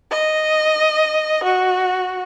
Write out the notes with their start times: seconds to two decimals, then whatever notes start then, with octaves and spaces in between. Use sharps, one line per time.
0.11 D#5
1.44 F#4